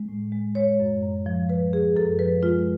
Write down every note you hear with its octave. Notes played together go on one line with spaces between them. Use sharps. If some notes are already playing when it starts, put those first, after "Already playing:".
Already playing: G#3
A2
G#3
G#3 C#5
F#2
F#2
F3
G#3 B4
F#2 G#4
F#2 A4
F3 B4
G#3 F4